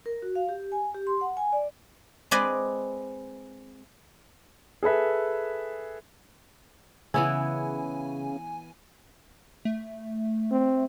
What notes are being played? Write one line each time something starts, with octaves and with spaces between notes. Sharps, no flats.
A#4
F#4
F5
G4
G#5
G4
C6
F#5
G#5
D5
G#3 C4 B4 D5 D#5 G#5
G#4 A4 B4 E5
C#3 E3 B3 E4 G#5
A3
C4